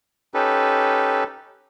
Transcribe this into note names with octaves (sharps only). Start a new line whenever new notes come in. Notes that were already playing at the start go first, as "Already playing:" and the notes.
C#4 D#4 G4 A4 B4